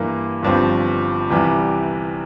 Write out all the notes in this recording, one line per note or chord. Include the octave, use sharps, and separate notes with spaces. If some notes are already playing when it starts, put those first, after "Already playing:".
Already playing: G2 E3 A#3
G1 G2 F3 C4
C2 C3 E3 G3